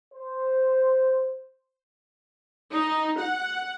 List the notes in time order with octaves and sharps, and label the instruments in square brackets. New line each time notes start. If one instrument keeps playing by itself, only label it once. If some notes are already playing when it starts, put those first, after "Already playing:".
[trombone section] C5
[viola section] D#4
F#5